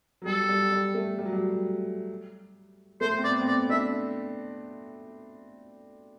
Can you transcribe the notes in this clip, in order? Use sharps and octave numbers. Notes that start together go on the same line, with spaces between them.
F#3
G3 A4
G3
G3
A3
G3
F#3
G3
A3 C5
C4
B3 D5
C4
B3 D5
D4 E5